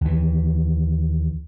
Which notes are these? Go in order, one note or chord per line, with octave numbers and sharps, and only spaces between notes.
D#2 E3